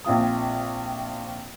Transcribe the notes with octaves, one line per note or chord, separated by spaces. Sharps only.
A#1 C4 F4 D#6